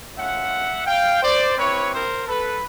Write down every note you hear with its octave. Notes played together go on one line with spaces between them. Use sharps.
A3 C#4 F4 E5 F#5
F5 G5
C5 D5
C4 E4 G4 B4 C#5
A#4 C5
A4 B4